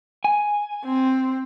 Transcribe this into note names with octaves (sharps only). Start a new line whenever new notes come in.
G#5
C4